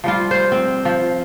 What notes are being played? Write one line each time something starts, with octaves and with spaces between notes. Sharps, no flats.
F3 G3 F4
C5
C4
F3